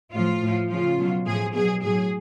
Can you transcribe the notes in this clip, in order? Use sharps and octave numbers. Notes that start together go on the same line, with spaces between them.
A2 F3 F4
A2 F3
C#3 F3 F4
B2 F#3
A2 F3 G#4
B2 F#3 G#4
A2 F#3 G#4